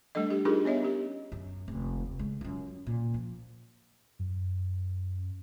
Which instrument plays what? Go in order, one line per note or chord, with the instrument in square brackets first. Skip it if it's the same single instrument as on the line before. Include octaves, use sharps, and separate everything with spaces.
[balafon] G3 A3 D4 A4 D#5
G4
D4 D#4 F4 G4 G#4 A#4
B3 C#5 D#5 E5
C#4 G4
[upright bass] F#2
F1 D#2
C#3 G#3
F#2 F4
A#2
F3
[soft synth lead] F#2